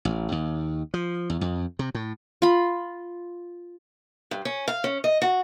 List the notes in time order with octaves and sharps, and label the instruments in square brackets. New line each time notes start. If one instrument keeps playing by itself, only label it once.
[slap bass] A1
D#2
F3
E2
F2
C3
A2
[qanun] F4 B5
[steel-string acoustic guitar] G2
C#4
F5
C#4
D#5
F#4